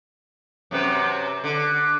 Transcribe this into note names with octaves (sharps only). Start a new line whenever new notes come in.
F#2 C3 B4
D3